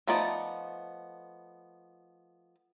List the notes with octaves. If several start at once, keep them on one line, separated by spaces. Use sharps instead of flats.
F3 A3 B3 D#4 D5